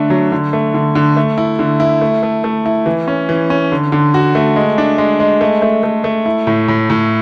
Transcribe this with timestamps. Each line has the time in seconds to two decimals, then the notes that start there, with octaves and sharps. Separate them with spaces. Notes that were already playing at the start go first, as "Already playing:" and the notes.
Already playing: D3 A3 D4
0.10 F#3
0.32 D3
0.53 A3
0.74 D3
0.95 D3
1.17 A3
1.38 E4
1.59 D3
1.80 E4
2.01 A3
2.23 A3
2.44 A3
2.66 E4
2.86 E3
3.08 C#4
3.29 E3
3.50 C#4
3.72 D3
3.92 D3
4.14 F#4
4.35 A3
4.56 G#3
4.78 D4
4.98 G#3
5.20 G#3
5.41 A3
5.62 A3
5.83 A3
6.04 A3
6.26 E4
6.47 A2
6.68 A2
6.90 A2